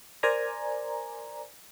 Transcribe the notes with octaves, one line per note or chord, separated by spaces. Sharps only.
A#4 C5 D5 G#5 A#5